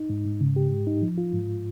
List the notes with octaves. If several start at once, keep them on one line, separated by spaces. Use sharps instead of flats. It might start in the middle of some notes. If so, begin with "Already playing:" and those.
Already playing: D#4
G#2
G#2
C#3
G4
G#2
D#4
F3
F4
G#2